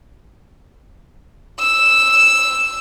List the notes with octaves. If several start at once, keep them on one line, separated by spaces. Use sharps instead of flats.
E6